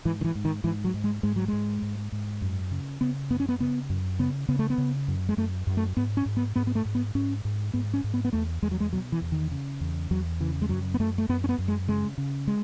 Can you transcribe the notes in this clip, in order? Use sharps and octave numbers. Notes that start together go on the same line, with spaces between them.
G#2 E3
D#3
E3
G#2
D#3
G#2 E3
F#3
G#2
G#3
G#2 G#3
F#3
G#2 G#3
G#2
G#2
F#2
C#3
C#3 B3
F#2 B3
C#4
B3
C#3 B3
F#2
C#3 B3
C#3 B3
A3
B3
C#3
F#2
G#3
F#2 A3
F#2
A3
G#2 B3
C#4
G#2
B3
G#2 B3
B3
A3
G#2
B3
G#2 C#4
G#2
G#2 B3
C#4
G#2
B3
B3
E2 A3
E2 G#3
F#3
G#3
B2 F#3
E3
E2
D#3
C#3
E2
E2 F#3
C#3 E3
G#3
F#2 F#3
B3
F#2 A3
A3
F#2 B3
C#4
B3
F#2
G#3
C#3 G#3
C#3
G#3